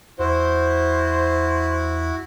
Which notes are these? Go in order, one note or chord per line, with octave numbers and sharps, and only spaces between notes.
E2 E4 F#4 C5